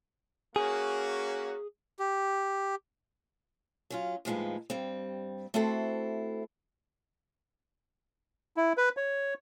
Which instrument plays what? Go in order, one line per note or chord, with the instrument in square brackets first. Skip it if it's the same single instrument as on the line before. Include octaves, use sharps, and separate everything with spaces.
[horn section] A#3 C#4 F#4 [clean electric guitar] G#4
[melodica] G4
[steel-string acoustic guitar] F#3 C#4 F4
D#2 A2 F3 G#3 D#4 B4
G2 G3 C4
A3 C4 E4 F#4 A4 C5
[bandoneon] E4
B4
C#5